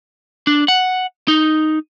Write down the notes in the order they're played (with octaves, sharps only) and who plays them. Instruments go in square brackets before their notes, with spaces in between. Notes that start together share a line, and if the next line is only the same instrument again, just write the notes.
[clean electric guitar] D4
F#5
D#4